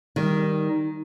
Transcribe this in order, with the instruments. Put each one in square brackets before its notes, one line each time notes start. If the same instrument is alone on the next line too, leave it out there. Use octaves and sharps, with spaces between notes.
[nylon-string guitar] D#3 G3